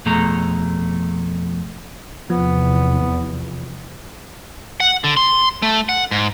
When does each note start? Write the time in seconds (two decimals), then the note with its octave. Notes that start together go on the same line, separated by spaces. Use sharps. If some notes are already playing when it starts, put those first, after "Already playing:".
0.05 F2 B2 A3 G#4 A4 A#5
2.30 E2 C3 F3 B3
4.80 F#5
5.04 D3
5.17 C6
5.62 A3
5.89 F#5
6.11 G#2